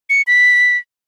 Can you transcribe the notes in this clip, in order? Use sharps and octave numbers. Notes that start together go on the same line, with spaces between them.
C#7
B6